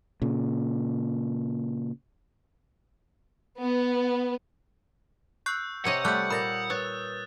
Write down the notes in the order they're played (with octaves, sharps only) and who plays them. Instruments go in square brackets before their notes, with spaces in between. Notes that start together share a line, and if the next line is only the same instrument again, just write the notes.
[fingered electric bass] A#2 C#3
[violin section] B3
[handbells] C#6 F#6 C7 [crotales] E6 G6
[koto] C3 C#5 D#5 [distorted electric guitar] F#5
[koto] G3 A3 [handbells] F#6 G6
[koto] A#2 [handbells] B5 A6 A#6 [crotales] D#6
[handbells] B4 [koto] C#5 [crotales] D#6 F#6 A6